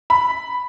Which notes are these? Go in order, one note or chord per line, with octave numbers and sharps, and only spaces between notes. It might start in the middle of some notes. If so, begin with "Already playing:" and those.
B5